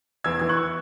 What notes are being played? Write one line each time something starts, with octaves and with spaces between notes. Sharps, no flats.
E2 E6 G#6
E3 G#6
C#6 F#6